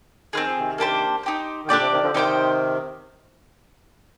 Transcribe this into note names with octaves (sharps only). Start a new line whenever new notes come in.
D#3 C4 F4 G#4
F3
C3 D#3
A#3 D4 G4 C5
D#4 G4 C5
D#3
A#2 D3 D4 G4 D5 G5
C3
C3 D#3
D3 F3
C3 D#3 D#4 G4 C5 G5